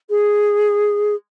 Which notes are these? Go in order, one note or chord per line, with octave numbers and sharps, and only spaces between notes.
G#4